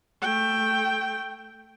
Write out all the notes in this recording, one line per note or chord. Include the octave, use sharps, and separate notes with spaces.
A3 G5